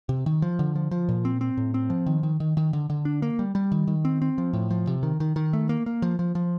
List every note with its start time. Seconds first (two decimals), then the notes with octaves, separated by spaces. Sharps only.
0.09 C3
0.26 D#3
0.42 F3
0.59 D3
0.76 F3
0.91 F3
1.09 A#2
1.25 C4
1.41 C4
1.57 A2
1.74 C4
1.90 F3
2.06 D#3
2.23 D#3
2.40 D#3
2.57 D#3
2.73 D3
2.90 D3
3.05 D4
3.22 A#3
3.39 G3
3.55 G3
3.72 D#3
3.87 D#3
4.05 C4
4.22 C4
4.38 F3
4.53 A2
4.70 F3
4.87 C3
5.03 D#3
5.20 D#3
5.36 D#3
5.53 A3
5.69 A#3
5.86 A#3
6.02 F3
6.19 F3
6.35 F3